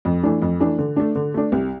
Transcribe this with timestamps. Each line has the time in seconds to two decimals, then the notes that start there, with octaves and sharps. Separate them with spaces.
0.05 F2
0.23 E3 A3 D4
0.42 F2
0.60 E3 A3 D4
0.78 D3
0.96 A3 D4
1.16 D3
1.34 A3 D4
1.52 C2